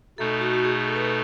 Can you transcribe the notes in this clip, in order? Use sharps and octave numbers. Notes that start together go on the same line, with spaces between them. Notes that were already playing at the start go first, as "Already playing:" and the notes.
B2 A3 D#4 A4
F#4
F#4
G#4
A4
B4
A4